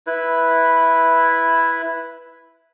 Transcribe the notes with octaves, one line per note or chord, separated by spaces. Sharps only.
E4 B4